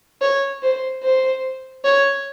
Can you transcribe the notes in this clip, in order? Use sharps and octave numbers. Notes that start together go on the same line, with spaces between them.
C#5
C5
C5
C#5